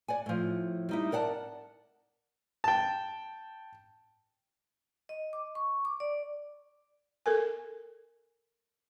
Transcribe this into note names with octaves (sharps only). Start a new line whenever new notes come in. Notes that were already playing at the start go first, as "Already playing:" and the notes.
D5 F#5 G#5
A2 F3
G3 D#4 E4
A#4 D5 F#5 G#5 A5
G5 A5
D#5
D6
C#6
D6
D5
A4 A#4 G#5